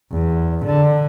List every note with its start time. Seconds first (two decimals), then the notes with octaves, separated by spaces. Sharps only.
0.12 E2
0.66 D3